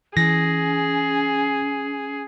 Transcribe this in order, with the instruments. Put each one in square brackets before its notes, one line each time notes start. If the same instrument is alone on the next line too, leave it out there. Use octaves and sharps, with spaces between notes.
[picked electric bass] E3 [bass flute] C#4 [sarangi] G#4 [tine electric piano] A#6